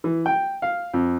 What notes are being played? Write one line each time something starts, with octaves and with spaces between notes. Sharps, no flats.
E3
G5
F5
F2